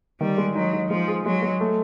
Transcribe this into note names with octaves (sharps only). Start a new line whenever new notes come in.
D#3 G3
G#3
F#3 D#4
D#4
F3 G#3
G#4
F#3 G#3
G#3
A3